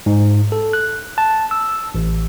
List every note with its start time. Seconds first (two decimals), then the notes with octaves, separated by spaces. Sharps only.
0.06 G#2
0.52 A4
0.73 F#6
1.18 A5
1.51 E6
1.95 A1